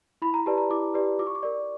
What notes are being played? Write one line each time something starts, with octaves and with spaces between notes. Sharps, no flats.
E4 B5
A#5
G4 B4 D5 A5
A#5
E4 D6
G4 B4 D5
F4 D6
C#6
D6
A#4 D5